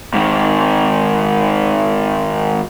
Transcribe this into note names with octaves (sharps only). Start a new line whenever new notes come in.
G#2 D#3